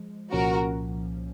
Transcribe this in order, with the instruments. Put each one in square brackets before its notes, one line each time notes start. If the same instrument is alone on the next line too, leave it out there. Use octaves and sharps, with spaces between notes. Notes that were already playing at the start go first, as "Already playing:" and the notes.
Already playing: [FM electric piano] F3 G#3
[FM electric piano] C2 A#2 F3 A#3 C#4 [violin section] F#4 A#4